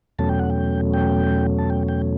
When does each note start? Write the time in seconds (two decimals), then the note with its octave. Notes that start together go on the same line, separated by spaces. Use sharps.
0.19 E2 B2 F#3 A3 C#4 A5
0.29 G5
0.39 F#5
0.50 G5
0.94 G5
1.58 A5
1.70 G5
1.88 G5